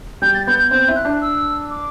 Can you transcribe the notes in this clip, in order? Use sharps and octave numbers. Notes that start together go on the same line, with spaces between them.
G3 G6
A6
B3 G6
G6
C4 G6
E4
F#6
D4
E6
D6